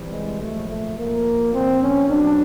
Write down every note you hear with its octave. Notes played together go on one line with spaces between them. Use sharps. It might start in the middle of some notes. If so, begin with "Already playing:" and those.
Already playing: C3 E3 G3
G#3
A#2 F3 A3
A3
A#2 F3 A#3
A#2 F3 C4
C#4
B2 F#3 D4